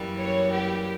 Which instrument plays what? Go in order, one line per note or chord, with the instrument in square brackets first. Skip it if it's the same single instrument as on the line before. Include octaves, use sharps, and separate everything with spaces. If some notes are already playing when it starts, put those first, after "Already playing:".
Already playing: [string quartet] F#2 E3 G3 A#3
[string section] C#5
G4